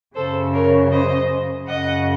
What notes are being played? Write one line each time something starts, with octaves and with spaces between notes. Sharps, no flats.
F#2 C#3 A4 C5
A#4 C#5
C5 D#5
F#2 C#3 D#5 F#5